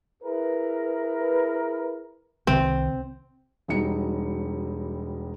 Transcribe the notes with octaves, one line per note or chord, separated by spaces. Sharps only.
E4 G#4 A#4 B4
C2 C3 D#3 C4
E1 F#3 G3 D#4 C#7